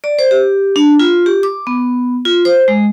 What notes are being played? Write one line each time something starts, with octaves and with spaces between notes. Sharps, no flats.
D5
C5
G4
D4
F4
G4
D6
B3
F4
C5
G#3